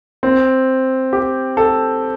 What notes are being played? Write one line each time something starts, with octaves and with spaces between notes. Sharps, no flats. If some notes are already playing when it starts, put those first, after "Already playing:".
C4
G4
A4